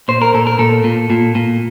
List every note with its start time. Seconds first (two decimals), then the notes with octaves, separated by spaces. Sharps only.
0.08 A#2 C5
0.22 A#4
0.34 A#2 A4
0.47 A#4
0.59 A#2 A4
0.84 A#2
1.10 A#2
1.35 A#2